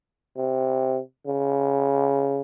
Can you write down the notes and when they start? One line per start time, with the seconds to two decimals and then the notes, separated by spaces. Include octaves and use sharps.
0.37 C3
1.27 C#3